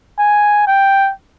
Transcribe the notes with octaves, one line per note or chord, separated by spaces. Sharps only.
G#5
G5